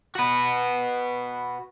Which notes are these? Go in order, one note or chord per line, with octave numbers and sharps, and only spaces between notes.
F#4 B4